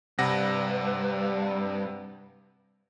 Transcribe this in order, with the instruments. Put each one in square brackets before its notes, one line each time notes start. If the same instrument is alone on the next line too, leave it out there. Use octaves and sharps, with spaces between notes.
[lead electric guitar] G2 [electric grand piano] C3 F#5 A#6